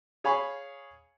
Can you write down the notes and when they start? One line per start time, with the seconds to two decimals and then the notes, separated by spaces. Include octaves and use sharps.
0.24 G#4 C#5 F5 G#5 B5 C#6